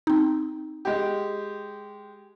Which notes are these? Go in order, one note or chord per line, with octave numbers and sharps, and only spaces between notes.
C4 D#4
G#3 G4